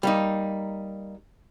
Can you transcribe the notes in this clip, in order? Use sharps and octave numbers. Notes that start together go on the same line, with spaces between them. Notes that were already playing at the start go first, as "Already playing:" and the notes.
G3 A#3 D#4